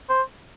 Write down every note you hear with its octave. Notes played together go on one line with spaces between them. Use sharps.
C5